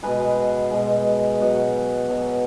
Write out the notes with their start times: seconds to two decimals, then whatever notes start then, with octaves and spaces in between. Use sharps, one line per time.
0.03 B2 G#3 G#4 B4
0.71 B2 G#3
1.40 B2 F#3 D#5 F#5
2.09 B2 F#3